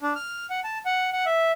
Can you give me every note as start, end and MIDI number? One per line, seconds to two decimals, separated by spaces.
0.01 0.13 62
0.16 0.46 89
0.50 0.60 78
0.64 0.78 81
0.86 1.10 78
1.13 1.25 78
1.26 1.52 76